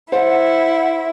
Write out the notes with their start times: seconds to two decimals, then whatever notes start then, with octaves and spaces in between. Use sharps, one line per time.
0.12 E4 C5 F#5